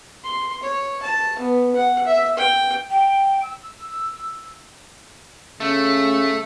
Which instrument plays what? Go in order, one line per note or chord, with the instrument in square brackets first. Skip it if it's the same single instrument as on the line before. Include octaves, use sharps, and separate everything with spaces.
[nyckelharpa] C6
C#5
A5
B3
F#5
E5
G5
[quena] G5
E6
[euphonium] C#3 [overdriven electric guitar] A3